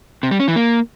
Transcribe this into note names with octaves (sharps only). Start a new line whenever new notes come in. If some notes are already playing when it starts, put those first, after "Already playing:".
C3
G3
C#4
E3
A#3